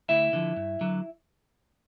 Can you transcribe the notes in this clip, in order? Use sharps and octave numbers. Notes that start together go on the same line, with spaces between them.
D2 E4 E5
D3 F3
G2
D3 F#3